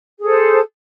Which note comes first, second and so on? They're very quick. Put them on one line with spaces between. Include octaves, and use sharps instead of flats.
G#4 A4 C5